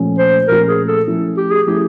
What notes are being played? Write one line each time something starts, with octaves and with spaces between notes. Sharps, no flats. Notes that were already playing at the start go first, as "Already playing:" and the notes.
Already playing: A#2 F3 A3 C#4 F4
C5
A#2 F3 A3 C#4 F4 A#4
G#4
A4
F3 A3 C#4 E4
G4
G#4
F3 A3 C#4 E4 G4